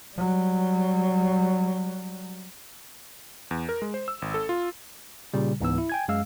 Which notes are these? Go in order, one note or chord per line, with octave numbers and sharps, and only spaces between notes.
F#3 G3
E2
A#4
G#3
C5
E6
G#1
A4
F4
A#2 C#3 G3
C#2 G#2 E3 B3 E6
E4
G5 G#5 G#6
F#2 G#3 F5 E6